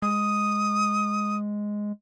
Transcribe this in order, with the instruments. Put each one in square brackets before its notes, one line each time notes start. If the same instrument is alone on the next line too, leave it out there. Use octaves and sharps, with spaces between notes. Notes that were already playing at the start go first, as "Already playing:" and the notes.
[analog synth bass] G#3 [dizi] D#6